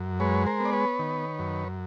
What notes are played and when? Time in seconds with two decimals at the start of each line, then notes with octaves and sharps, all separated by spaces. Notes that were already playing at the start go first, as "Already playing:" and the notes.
Already playing: F#2
0.20 G#3 B4 C#5
0.46 A#4 C5
0.60 B3
0.65 D5
0.73 B4 C#5
0.99 D#3
1.39 F#2